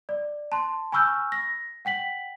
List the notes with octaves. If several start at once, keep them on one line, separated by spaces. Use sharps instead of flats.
D5
A5 C6
G#5 B5 C#6 E6 F6 G6
A#6
F#5 G5 B6 F#7